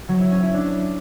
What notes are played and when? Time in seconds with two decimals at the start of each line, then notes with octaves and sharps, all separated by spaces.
0.09 F#3
0.20 E4
0.31 C#4
0.43 E4
0.54 D4